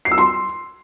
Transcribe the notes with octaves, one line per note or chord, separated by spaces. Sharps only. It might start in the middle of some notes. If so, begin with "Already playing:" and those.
C7
E6
C6